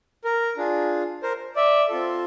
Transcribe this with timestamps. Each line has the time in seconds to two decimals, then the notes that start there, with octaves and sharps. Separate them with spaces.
0.24 A#4
0.57 D4 F4 G#4
1.23 A#4 C5
1.56 D5 E5
1.89 C4 F4 A4